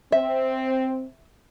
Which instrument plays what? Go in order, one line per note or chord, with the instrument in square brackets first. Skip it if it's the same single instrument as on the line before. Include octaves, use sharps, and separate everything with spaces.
[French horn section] C4 [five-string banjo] E5